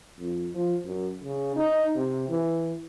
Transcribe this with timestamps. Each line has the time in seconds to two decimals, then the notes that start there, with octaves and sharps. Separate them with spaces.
0.20 F2
0.55 F3
0.85 F#2
1.24 C#3
1.56 D#4
1.96 C3
2.29 E3